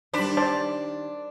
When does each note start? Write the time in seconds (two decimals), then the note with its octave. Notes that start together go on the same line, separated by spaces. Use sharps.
0.14 D#3 G3 D4 C5 B5
0.37 C5 D5 A5